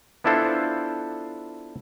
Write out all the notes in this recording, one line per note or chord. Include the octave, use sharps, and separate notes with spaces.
B3 D4 E4 F4 A4 C5